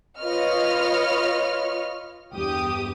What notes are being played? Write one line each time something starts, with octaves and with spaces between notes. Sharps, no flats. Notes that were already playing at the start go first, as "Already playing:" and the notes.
F4 B4 C#5 D#5 C#6 F6
E2 G2 G4 D#6